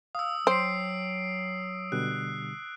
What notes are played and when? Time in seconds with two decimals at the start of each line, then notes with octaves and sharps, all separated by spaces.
0.15 F5 D#6 E6
0.47 F#3 C5 G5 C7 D7
1.92 B2 D3 G3 F#6